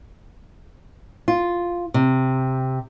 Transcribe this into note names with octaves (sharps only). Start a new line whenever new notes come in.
F4
C3